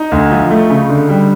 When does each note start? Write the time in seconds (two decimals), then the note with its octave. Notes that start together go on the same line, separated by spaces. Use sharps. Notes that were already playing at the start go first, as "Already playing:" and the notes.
Already playing: D#4
0.12 D2
0.31 F3
0.51 A3
0.70 C#3
0.89 D3
1.09 G3